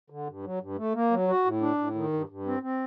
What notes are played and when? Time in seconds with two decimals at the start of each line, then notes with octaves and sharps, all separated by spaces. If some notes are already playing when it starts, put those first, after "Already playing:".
0.10 D3
0.27 G2
0.44 F#3
0.61 G2
0.78 A3
0.94 A#3
1.11 F#3
1.28 F#4
1.45 A2
1.61 D4
1.78 A2
1.95 D#3
2.13 G2
2.29 G2
2.46 C4
2.63 C4